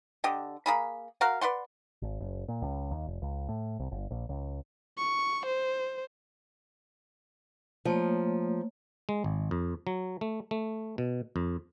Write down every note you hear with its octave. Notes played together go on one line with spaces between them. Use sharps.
D3 G4 D#5
A#3 G#4 B5
F#4 A#4 F5 F#5
B4 D5 F#5 C6
G#1
F#1
A#2
C#2
D#2
F1
C#2
A2
C2
G1
A#1
C#2
C#6
C5
F3 A3 A#3 C#5
G#3
G#1
F2
F#3
A3
A3
B2
F2